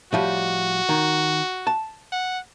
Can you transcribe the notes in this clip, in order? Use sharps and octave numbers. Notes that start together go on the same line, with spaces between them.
A2 F3 G3 F#4
D#3
A5
F#5